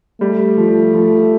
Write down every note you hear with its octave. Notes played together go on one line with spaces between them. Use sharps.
G3 A3
F3
F3